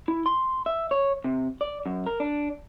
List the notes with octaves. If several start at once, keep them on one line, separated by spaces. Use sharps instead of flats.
E4
C6
E5
C#5
C3
D5
F#2
A#4
D4